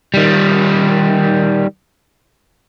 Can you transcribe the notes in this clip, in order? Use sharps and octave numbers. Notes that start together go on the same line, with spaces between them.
D#3 G3